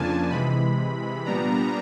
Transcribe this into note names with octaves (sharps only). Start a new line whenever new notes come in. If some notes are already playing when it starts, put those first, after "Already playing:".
Already playing: F2 C#3 F3 A#3 D4 G#5 A5
C3 E3 G#3 B5
A#2 G3 B3 D4 A#5